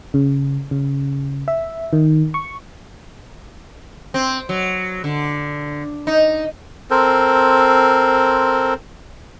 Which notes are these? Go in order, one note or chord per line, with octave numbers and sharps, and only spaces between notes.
C#3
C#3
E5
D#3
C#6
C4
F#3
D3
D#4
C4 A4 A#4 C5